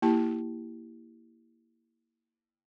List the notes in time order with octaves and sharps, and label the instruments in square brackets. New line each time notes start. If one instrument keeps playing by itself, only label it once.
[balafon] A#3 E4 G4 A5